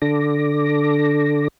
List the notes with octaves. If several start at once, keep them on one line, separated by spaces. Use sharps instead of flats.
D3 D4 A4 D6 A#6